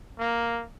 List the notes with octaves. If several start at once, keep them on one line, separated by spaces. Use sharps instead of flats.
A#3